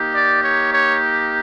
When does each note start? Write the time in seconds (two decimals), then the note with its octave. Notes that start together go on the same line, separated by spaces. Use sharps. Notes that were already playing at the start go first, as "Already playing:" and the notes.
Already playing: A#3 D#4 G4
0.12 D5
0.41 C#5
0.71 C#5